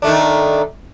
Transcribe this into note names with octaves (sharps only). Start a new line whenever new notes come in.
D#3 A3 D4